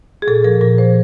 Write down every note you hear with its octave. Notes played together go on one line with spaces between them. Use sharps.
G#4
A#2 A4
F3 A#4
A#2 A#4
F3 C5